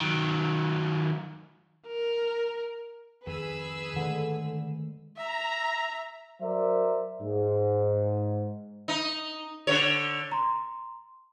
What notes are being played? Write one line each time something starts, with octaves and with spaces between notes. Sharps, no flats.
D#3 F#3
A#4
F2 D#3 G#4 B4 E6
D3 D#3 G#3 A3
E5 A#5
F#3 A#4 C5 D5 E5
G#2
D#4
D3 C#5
A#5 C6